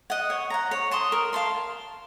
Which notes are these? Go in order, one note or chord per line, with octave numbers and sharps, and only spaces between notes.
D#5 F#5
C#5
F#5 A#5
C#5
A5 C6 D#6
A#4
F5 A5 C6